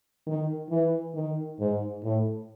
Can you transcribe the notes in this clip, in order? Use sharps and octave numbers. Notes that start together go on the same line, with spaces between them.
D#3
E3
D#3
G#2
A2